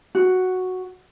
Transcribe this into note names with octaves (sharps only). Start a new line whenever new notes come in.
F#4